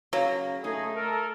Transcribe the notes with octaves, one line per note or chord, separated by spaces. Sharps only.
C#3 F#3 A#3
A3 D#4 G#4
A4 A#4